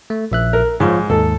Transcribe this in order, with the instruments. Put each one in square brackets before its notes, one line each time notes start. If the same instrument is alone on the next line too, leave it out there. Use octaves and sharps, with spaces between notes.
[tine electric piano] A3
A#1 E5 F#6
[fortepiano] A#4
[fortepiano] G#2 [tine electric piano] F3 F4 C#5
[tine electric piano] D#2 G#2 [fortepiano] A4